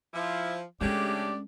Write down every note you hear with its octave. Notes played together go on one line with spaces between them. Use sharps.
F3 E4
C#3 G#3 A3 C#4 D4 G4 D5